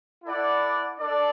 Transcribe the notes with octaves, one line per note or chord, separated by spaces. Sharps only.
E4 A4 D5 F#5
D4 A4 D5